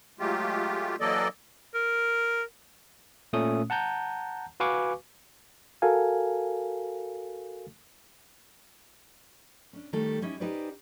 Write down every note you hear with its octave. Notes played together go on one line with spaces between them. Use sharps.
F#3 G#3 A3 F4 G4
E3 F#3 A#3 A4 D5 D#5
A#4
A#2 A3 C#4 D#6
F#5 A5 A#5 G6
F#4 B4 F5 G#5 C#6 D6
F#4 A4 A#4 F5 G#5
C#4 D4
D#3 G3 A3 G4 A4
G3 C#4 D#4 E4
C#4 D#4 G4 B4 C5 D5